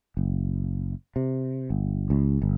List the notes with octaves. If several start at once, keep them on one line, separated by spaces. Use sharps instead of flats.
F#1
C3
G1
C#2
G1